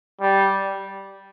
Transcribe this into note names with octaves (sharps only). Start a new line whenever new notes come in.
G3